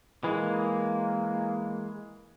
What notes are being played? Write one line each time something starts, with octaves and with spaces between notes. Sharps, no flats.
E3 G#3 A#3